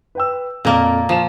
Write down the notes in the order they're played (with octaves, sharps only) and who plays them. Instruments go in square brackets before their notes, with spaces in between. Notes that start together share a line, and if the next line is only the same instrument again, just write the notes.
[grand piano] B4 G5 E6
[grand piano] F2 A4 [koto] A#2 A#3
[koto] F3 [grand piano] F4 E7